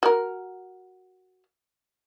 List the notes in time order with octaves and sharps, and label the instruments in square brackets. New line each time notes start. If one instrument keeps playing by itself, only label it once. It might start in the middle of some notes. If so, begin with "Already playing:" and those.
[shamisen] F#4 A#4